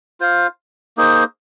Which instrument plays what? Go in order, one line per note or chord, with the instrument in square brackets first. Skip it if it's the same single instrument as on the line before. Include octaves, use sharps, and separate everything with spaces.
[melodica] F4 C5 F5
A#3 D#4 G#4 C5